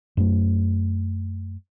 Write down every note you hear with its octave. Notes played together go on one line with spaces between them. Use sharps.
F#2 A3